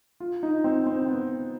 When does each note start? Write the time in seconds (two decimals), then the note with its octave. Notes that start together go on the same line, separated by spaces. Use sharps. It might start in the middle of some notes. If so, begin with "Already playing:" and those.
0.20 F4
0.43 D#4
0.64 C4
0.87 C4
1.08 B3